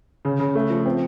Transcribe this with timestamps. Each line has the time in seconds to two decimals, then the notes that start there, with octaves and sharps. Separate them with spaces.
0.25 C#3
0.39 C#3
0.55 A3
0.70 F3
0.85 C4